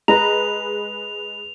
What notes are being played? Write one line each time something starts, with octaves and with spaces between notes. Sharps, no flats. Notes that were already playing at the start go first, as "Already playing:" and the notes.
G#3 B4 A#5 F7